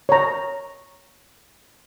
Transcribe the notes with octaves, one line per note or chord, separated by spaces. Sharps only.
C#5 A#5